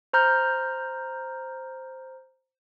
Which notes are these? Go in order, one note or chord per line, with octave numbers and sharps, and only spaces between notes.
C5 A#5 F6 G6